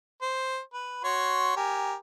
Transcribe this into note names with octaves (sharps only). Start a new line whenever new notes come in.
C5
B4
F#4 C#5 C6
G4 A#4 G#5